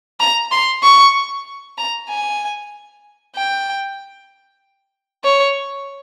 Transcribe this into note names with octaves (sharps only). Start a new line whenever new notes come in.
A#5
C6
C#6
A#5
G#5
G5
C#5